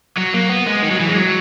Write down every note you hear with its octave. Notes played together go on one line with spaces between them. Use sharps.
F#3
A#3
B3
G#3
D#3
F#3
E3
G#3
F#3